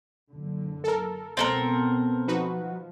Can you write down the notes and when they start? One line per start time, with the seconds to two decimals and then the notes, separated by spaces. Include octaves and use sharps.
0.31 F#1 D3
0.84 A4 A#4
1.37 C#2 B2 B3 C4 A4 A#4
2.28 F3 D#4 F#4 B4